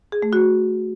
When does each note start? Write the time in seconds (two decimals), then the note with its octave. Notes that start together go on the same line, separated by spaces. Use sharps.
0.12 G#4
0.22 A3
0.33 F#4